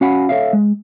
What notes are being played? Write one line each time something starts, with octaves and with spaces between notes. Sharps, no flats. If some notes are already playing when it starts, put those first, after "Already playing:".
C#4 F#4 F5 F#5 G#5 B5
A4 C#5 E5 F5
G#3